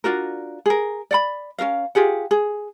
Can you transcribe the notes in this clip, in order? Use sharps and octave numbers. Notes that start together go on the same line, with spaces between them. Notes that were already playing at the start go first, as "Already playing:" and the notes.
D4 F4 F#4 A#4
G#4 A#4
D5 F#5 B5
C#4 F4 A#4 F5
F4 G4 G#4 F#5
G#4